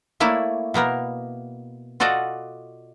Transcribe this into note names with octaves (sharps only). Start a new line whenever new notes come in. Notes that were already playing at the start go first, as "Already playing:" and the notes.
A3 A#3 E4 C#5 D5
B2 A#3 B3 A#4
F4 F#4 A4 D5 D#5